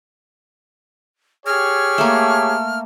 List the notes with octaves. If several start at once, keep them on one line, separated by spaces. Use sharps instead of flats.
G4 G#4 C#5 F6
A3 A#3